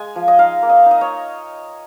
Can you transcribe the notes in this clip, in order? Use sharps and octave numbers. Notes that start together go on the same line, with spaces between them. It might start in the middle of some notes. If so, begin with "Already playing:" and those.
Already playing: G#3 G#5
F3
D#5
D#4 F5
A#3
D#5
D#4
D#5
C#5